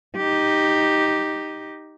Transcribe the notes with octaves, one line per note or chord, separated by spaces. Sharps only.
D#4 G4